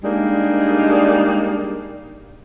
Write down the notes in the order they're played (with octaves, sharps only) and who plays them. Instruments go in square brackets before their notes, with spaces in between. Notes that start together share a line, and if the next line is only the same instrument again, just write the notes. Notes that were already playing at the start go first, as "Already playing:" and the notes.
[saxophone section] G3 G#3 A#3 D4 D#4